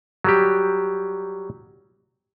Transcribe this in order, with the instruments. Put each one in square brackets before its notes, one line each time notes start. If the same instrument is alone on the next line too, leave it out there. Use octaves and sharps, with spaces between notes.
[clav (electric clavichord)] F#3 G3 G4